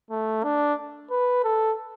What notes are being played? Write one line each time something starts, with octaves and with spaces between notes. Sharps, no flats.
A3
D4
B4
A4